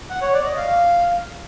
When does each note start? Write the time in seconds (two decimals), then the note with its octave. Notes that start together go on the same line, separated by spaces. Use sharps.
0.10 F#5
0.22 C#5
0.33 D5
0.45 D#5
0.57 F5